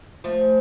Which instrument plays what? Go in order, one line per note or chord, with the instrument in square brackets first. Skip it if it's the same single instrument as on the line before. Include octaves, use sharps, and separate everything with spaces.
[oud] F3 A3